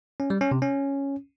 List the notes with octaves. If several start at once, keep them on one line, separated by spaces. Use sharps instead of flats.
C#4
G3
C#4
C3
C#4